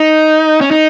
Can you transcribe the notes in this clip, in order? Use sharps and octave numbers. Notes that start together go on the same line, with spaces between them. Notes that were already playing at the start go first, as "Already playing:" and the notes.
Already playing: D#4
C#4
D#4